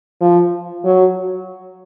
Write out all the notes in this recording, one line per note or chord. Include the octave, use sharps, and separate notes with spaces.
F3
F#3